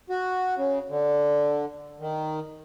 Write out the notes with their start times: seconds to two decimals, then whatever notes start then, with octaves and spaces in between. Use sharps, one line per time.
0.10 F#4
0.56 C#3
0.89 D3
2.00 D#3